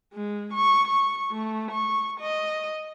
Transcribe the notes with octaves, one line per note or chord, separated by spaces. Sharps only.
G#3
C#6
C#6
A3
C#6
D#5